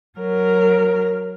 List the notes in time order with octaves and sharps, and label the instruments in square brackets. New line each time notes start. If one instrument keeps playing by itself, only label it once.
[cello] F#3 A#4